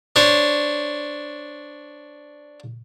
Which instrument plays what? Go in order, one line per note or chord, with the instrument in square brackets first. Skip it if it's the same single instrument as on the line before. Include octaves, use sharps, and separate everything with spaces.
[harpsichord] D4 C5 C#5